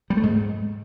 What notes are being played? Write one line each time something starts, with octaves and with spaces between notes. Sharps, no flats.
G3
A3
G#2